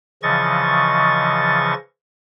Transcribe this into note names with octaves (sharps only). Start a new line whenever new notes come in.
C#3 E3 F3 D#5 C#6 A6